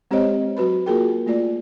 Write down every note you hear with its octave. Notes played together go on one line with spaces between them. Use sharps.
G#3 C4 G4 C5 C#5 D#5
F#3 F#4 B4 B5
A#3 F4 F#4 G#4 A#4 G5
A3 A#3 F4 D5